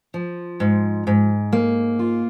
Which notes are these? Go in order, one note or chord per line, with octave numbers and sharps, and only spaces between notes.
F3
G#2
G#2
A#3
F4